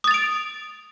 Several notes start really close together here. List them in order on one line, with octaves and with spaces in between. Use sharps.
D#6 A6 F7 D7